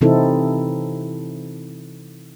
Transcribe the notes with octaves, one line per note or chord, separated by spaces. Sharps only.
C3 E3 C4 D#4 E4 A4